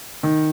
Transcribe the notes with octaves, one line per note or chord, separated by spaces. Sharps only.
D#3